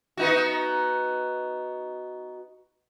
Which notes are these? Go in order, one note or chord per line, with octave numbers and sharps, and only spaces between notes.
B3 D#4 F#4